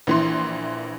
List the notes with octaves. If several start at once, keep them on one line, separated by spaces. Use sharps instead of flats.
A#1 E3 C6